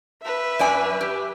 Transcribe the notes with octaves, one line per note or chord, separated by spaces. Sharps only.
B4 E5
F#2 D5 G#5
G4